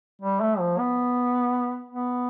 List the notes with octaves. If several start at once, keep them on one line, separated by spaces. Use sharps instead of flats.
G3
A3
F3
B3
B3